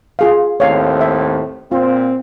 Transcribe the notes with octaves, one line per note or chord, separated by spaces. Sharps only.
F4 G#4 F5
D#2 A2 C4 C#5 F5
E5
A#2 C4 F4